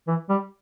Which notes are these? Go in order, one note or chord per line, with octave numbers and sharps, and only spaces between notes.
E3
G3